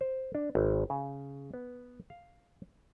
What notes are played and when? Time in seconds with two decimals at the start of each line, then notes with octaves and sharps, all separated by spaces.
0.01 C5
0.35 D4
0.55 G#1
0.90 C#3
1.54 B3
2.10 F5